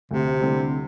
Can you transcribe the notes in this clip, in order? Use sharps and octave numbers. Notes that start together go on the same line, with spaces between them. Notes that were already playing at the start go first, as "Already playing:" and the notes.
D2 C3
D3 G3 C4 E4